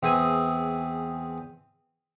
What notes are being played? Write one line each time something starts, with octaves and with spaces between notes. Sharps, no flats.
E2 C4 G#4 G#5